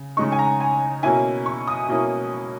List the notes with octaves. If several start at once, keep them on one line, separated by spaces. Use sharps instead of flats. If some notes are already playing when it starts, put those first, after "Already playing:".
Already playing: C#3
C#3 G#3 D#4 C#6
G#5
A#5
G#5
B2 A#3 C#4 E4 G#5
C#6
D#6
B2 A#3 C#4 E4